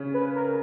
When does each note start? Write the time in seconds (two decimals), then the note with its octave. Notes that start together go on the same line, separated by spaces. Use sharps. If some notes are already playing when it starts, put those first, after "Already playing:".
Already playing: C#3 C#4
0.14 B4
0.36 A#4